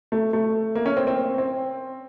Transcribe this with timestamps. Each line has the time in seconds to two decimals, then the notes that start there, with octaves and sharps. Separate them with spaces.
0.12 A3
0.33 A3
0.75 A#3
0.86 C#4
0.97 C4
1.07 C4
1.38 C4